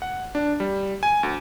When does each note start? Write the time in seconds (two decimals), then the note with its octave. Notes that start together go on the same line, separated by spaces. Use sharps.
0.02 F#5
0.35 D4
0.60 G3
1.03 G#5
1.23 D2